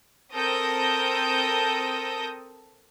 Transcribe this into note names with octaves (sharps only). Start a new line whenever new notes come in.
C4 A4 A#4 D#6 G6 A#6